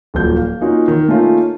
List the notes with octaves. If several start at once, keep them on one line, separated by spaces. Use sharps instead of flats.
D#1 F3 F#3 G6
F5
A#3 C#4 D#4 F4 F#4
D#3
A3 A#3 C#4 D#4 F4